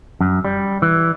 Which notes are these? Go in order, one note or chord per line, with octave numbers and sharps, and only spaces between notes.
F#2
G3
E3